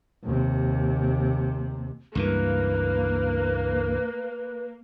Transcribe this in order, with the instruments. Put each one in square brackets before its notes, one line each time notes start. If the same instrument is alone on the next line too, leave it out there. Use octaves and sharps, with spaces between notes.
[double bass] D#2 C3
[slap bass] C#2 G2 E3 [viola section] A#3 [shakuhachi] B4